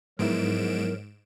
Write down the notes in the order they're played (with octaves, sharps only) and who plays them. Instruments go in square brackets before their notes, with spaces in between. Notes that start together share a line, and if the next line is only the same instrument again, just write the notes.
[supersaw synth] G#2 D7 E7 [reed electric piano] F3 B3 E4 [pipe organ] F#3 A#4